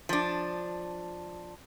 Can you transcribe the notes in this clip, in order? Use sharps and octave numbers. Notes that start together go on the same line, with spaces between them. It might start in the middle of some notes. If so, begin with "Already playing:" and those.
F3 D4